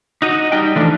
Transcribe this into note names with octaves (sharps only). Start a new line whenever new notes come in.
D#4 F#4 D#5
G3 D#4 G5
D3 E3 F3 A3 D4